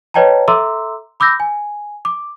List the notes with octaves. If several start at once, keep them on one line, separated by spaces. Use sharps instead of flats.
B4 C#5 D#5 G5 A5 A#5
A4 E5 A#5 C6 D6 E6
B5 D6 E6 G6 A#6
G#5
D6